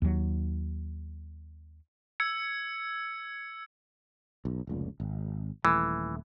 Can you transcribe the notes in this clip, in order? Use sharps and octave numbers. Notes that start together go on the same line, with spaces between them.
D#2 F#3
E6 G#6 C#7
B1
F1 C#2 A#2
G#1
D#1 E3 A3